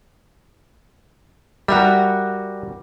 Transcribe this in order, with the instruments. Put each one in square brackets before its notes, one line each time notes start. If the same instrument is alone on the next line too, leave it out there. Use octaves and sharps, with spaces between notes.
[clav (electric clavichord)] G3 [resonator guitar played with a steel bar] F#4 A#4 E5